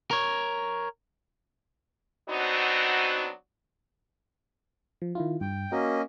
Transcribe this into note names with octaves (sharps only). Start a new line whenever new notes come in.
A#4 C#5
F#3 B3 C4 D4 D#4 F#4
F3
D#3 E4 F4
G2 G5
A#3 C#4 F#4 A#4 D#5